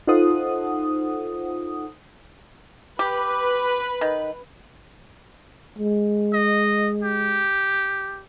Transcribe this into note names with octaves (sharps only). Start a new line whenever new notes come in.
D#4 F4 A4 C5 F#5 D#6
G4 B4
D#3
G#3
D#5
G4